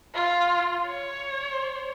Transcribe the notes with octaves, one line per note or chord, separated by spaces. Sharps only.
F4
C#5